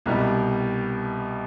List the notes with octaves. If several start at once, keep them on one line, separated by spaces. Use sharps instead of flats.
C2 B2 G3